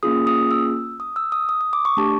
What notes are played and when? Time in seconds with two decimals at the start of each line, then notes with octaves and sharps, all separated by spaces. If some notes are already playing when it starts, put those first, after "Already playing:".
0.03 A#3 C#4 F4 G#4 D#6
0.27 D#6
0.51 E6
1.00 D#6
1.16 E6
1.32 D#6
1.49 D#6
1.61 D#6
1.73 D6
1.85 C#6
1.97 A3 D4 G4 A5